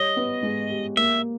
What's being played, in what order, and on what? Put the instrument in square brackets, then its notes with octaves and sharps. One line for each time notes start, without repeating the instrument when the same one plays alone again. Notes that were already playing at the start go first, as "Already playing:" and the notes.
Already playing: [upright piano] G3 C#5 [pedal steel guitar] D#5
[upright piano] B3
G#3
G4
[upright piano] A#3 [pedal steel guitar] E5